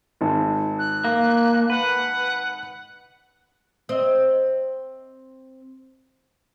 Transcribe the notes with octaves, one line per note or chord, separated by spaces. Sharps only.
G#1
F#6
A#3
B4 F#5
C4 D#5